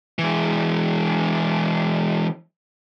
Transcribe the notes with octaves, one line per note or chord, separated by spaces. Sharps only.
E3 G#3